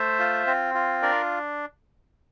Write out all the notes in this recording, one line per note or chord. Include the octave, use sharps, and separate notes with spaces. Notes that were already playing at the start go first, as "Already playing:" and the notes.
Already playing: A3 C5 E5
F4
C4
F4
D4 A#4 D5